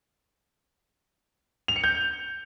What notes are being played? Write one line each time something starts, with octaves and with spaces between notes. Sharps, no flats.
F7
C#7
G6